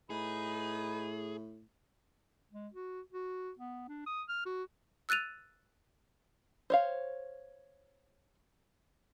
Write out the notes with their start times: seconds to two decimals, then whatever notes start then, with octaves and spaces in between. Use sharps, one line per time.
0.10 A2 D#4 G#4 B4 B5
2.52 G#3
2.74 F#4
3.13 F#4
3.59 B3
3.88 D4
4.07 D#6
4.29 F6
4.46 F#4
5.09 E6 F#6 A6 D#7 F7
6.70 C5 C#5 F5